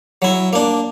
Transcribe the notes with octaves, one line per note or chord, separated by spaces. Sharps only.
F#3 E4
A#3 D4